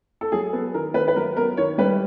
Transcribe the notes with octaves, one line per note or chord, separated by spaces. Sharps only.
A4
F#3 G#4
B3 A4
D#3 A#4
D#3 B4
B4
F#3 A#4
B3 A#4
D#3 C#5
G3 B4